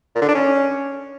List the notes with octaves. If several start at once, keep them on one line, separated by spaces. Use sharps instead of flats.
A#2
D3
D4
C#4